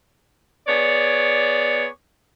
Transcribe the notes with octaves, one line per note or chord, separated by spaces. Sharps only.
B3 G#4 C#5 D5